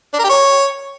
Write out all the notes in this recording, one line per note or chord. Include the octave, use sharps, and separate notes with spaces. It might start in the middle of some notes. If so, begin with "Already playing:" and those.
D4
A#4
G4
C#5